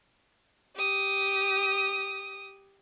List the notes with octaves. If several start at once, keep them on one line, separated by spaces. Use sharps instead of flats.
G4 D#6